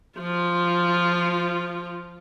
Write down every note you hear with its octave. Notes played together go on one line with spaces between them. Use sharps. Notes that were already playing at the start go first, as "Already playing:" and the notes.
F3 F4